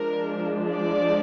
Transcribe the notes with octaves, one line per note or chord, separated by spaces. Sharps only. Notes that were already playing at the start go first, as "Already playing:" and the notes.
Already playing: F3 G#3 D4 A#4
D5